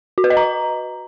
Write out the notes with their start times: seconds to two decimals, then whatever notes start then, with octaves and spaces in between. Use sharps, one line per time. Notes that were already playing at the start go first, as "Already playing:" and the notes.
0.18 F#4
0.24 B4
0.30 D#5
0.37 A#5